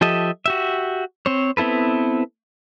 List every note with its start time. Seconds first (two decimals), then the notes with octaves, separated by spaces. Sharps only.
0.01 F3 G4 A4 D#5 E5
0.46 F#4 G4 E5
1.26 C4 C5 C#5
1.57 B3 C4 E4 A4 B4